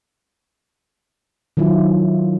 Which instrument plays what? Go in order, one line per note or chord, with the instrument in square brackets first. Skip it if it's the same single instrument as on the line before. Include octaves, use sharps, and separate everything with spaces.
[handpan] D#3 F#3 E4 F4